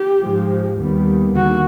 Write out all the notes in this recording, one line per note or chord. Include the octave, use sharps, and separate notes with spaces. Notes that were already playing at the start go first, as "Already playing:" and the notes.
Already playing: G4
G#2 F3 G#3
D#2 D#3 G3 B3
D#2 D3 F#4